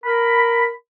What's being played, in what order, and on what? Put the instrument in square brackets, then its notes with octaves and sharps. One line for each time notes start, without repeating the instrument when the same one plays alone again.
[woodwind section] A#4 B5